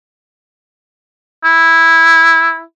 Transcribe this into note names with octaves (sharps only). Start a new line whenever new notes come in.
E4